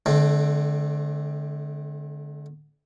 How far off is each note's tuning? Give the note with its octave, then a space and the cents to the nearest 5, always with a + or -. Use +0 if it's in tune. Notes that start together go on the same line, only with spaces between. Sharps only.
D3 +0 A3 -45 C4 +10